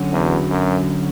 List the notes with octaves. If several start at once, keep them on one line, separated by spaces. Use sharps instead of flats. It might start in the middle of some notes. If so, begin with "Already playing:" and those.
Already playing: D3 F#3 C#4 F#4
E2
F#2